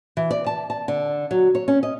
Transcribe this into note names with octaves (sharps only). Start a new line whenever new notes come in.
E3
D5
A5
A5
D3
F#3
C#5
C#4
D#5